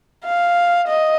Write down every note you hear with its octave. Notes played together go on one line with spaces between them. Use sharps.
F5
D#5